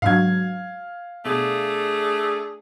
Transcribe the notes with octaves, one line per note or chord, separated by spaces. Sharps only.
G#2 D3 F#3 F5 G#6
B2 A3 D4 G#4